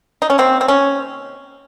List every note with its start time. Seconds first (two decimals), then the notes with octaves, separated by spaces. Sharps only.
0.22 D#4
0.30 C#4
0.38 C3 D#3 A#3 C4
0.61 C4
0.68 C#4